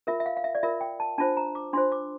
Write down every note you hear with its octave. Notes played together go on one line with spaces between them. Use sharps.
F4 A#4 E5
E5
F5
F5
E5
D5
F4 A#4 E5
G5
A5
D4 F4 C5 A5
A#5
D6
D4 F4 C5 C6
D6